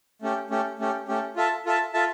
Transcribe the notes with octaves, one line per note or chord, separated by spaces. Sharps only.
A3 C#4 G4
A3 C#4 G4
A3 C#4 G4
A3 C#4 G4
F4 A4 E5 A5
F4 A4 E5 A5
F4 A4 E5 A5